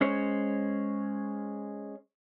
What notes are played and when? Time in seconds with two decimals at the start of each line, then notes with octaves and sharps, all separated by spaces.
0.01 G#3 C#4 C5 C#5